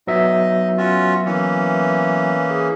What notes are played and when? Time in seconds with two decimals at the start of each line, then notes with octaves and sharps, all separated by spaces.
0.07 F#3 B3 D#4 D#5 E5
0.77 C#4 F4 F#4
1.25 E3 A#3 C#4
2.50 G#4